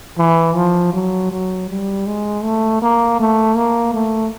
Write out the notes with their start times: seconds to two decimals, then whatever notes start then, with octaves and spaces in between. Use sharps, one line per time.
0.18 E3
0.55 F3
0.93 F#3
1.31 F#3
1.69 G3
2.07 G#3
2.44 A3
2.82 A#3
3.20 A3
3.56 A#3
3.94 A3